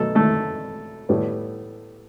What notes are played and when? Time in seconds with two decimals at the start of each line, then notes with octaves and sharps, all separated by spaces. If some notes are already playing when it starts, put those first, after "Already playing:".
Already playing: B2 F#3 A3 A4
0.15 A3 A4
1.09 A2 G3 B3